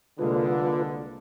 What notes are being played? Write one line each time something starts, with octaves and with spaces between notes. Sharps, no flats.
C2 D3 G#3 A#3 F4 B4